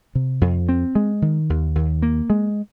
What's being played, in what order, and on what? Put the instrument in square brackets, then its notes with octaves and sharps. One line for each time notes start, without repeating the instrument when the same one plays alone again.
[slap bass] C3
F2
C4
G#3
D#3
D#2
D#2
A#3
G#3